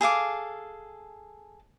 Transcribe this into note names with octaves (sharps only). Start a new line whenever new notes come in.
G#4 A4 F5 D6